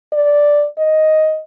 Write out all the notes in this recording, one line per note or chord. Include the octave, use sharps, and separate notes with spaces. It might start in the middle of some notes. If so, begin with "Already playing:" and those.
D5
D#5